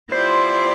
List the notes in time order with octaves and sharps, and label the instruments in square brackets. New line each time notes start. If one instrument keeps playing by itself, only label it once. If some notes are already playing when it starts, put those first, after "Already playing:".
[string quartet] F3 B3 E4 G4 D5 [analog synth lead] C5